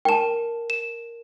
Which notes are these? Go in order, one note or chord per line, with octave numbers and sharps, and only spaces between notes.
A#4 G5 A5 E7
E7